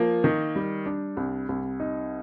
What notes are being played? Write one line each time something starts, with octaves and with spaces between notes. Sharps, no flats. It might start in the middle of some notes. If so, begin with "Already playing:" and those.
Already playing: F3 A#3
D#3
G3
D4
C2
C2
D#4